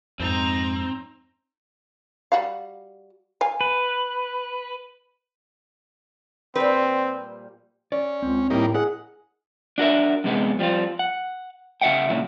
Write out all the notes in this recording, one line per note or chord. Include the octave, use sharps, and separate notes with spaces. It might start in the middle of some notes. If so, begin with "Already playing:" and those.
F2 G#2 C4 D#4 A#5
G3 F#4 F5
F5 G#5
B4
A#2 F3 G3 C4 B4
C#4 D5
C#2 C4
A2 G3 A#3 D#4
E4 G#4 A#4 D#5 F#5
D4 F#4 A#4 E5
F#2 C3 G#3 B3
F3 G3 B3 C4 F4
F#5
C#3 F#4 E5 F#5 G5
A#2 C#3 F#3 E4